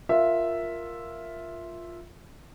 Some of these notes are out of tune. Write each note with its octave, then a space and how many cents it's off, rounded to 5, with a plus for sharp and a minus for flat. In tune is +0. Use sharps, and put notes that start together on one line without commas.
F4 +0 A#4 +0 E5 +0